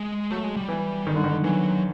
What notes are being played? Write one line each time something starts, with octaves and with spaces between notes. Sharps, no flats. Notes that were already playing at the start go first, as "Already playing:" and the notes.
Already playing: G#3
F#3 A3
G#3
G3
E3
D#3
D3
D#3
E3 F#3